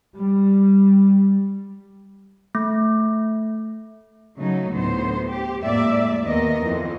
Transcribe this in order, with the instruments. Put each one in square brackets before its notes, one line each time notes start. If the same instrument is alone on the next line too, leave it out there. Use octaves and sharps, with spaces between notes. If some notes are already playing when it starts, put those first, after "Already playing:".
[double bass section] G3
[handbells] A3
[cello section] C#3 F#3 A3 D#4
D2 A2 B3 C5
G4
F2 A2 G#3 A#3 D5 E5
D#2 B3 A#4 D#5
F2 E3